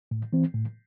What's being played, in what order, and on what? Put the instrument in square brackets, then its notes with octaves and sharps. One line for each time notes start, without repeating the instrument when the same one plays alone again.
[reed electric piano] A2
E3 C4
A2